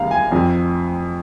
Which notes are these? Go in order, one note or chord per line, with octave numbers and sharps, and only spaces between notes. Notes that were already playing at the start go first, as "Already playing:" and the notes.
Already playing: C2 C3 D#3 A#3 F5 A#5
G#5
F2 F3 C4